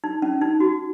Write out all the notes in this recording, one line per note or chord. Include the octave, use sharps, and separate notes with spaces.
D#4
C#4
D#4
F#4